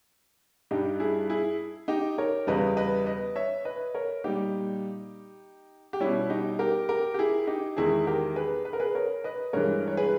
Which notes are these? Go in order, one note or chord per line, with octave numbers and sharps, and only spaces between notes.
G2 G3 D#4 G4
E4 G#4
E4 G#4
D#4 G4
A#4 C#5
E2 C#3 G3 B4 D#5
B4 D#5
B4 D#5
C#5 E5
B4 D#5
A#4 C#5
A#2 G3 D#4 G4
G4
B2 G3 C#4 E4
D#4 G4
G4 A#4
G4 A#4
G4
E4 G#4
D#4 G4
E2 D#3 G#3 E4 G#4
G4 A#4
G#4 B4
B4
A#4
G#4 B4
A#4 C#5
B4 D#5
G2 E3 G#3 A#4 C#5
C#5
G#4 B4